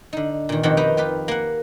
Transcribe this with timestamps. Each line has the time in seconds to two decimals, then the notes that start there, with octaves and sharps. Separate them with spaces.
0.13 D3 D#4
0.49 A#2 D#3
0.63 F2 B2 D#3 C4 G4 F#5
0.77 D#4 B4 G5 A#5
0.97 D#4 F4 G4 B4
1.28 A#3 F#5